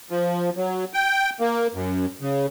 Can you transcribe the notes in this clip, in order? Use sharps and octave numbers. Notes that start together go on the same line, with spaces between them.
F3
F#3
G5
A#3
F#2
C#3